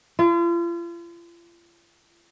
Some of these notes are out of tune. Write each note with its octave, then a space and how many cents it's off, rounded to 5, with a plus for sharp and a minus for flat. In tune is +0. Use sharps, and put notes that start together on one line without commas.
F4 -40